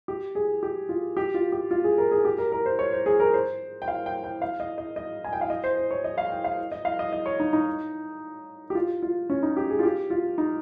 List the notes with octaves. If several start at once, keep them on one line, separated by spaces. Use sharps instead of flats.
G4
G#4
G4
F4
G4
F4
G4
F4
G#4
A#4
G#4
G4
A#4
A#4
C5
C#5
C5
G#4
A#4
C5
G5
F5
G5
G5
F5
D#5
D#5
D#5
G#5
G5
F5
D#5
C5
C5
C#5
D#5
F5
G5
F5
D#5
F5
D#5
D#5
C#5
D#4
D#4
G4
F4
F4
C#4
D#4
G4
G#4
F4
G4
F4
D#4